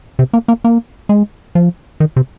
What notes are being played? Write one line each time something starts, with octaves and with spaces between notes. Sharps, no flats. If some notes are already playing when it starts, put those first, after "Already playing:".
C3
A#3
A#3
A#3
G#3
F3
D#3
C3